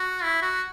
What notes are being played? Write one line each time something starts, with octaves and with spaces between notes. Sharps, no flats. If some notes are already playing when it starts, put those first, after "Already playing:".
Already playing: F#4
E4
F#4